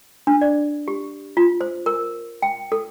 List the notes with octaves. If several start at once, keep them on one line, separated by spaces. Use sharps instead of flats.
D4
D5
G4
F4
C5
A#4
G5
A4